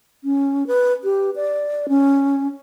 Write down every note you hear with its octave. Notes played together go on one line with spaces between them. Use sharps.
C#4
B4
G4
D5
C#4